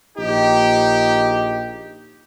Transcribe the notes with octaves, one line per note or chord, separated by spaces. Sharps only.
A#1 D#4 G4